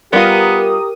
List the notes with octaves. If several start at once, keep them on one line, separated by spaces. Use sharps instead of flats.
G3 B3 F4 G4 A#4 D#6